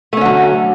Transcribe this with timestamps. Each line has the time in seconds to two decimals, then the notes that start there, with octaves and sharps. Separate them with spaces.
0.13 A3
0.17 C#4
0.21 D3
0.25 F#3